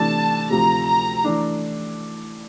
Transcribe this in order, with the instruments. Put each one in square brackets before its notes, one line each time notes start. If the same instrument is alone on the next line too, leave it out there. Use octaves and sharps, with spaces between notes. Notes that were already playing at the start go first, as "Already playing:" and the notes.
Already playing: [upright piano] C3 E3 A3 D4 [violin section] A5
[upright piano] D2 C3 F3 A3 [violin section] A#5
[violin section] A#5
[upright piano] E3 A3 D4